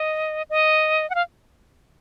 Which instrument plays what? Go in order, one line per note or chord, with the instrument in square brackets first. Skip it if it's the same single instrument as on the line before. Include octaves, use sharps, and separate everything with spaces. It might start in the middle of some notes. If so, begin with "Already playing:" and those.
Already playing: [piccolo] D#5
D#5
F#5
F5